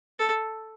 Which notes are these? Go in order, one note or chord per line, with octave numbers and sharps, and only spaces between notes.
A4